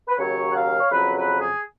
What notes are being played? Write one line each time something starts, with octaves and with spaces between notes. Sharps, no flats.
B4
D#2 C#3 F#3 C#5
F#5
F5
C#5
F2 C#3 F#3 B4
B4
G#4